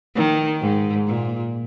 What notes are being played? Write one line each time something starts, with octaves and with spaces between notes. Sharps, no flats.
D#3
G#2
A#2